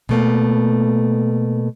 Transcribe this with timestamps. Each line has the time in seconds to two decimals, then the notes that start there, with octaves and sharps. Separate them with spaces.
0.09 B2 A3 A#3